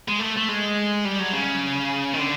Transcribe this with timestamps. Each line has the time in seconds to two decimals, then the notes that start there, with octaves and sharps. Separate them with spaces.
0.08 G#3
0.20 A3
0.37 A3
0.49 G#3
1.05 G3
1.20 F#3
1.33 C#3
2.14 D#3
2.19 D3